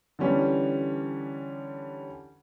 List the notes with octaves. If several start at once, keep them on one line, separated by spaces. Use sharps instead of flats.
D3 E3 G3 C#4